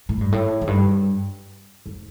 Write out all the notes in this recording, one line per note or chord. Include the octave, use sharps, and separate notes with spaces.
A2
G2
A2
F2
G2
F2